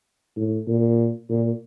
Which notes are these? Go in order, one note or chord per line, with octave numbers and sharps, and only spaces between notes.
A2
A#2
A#2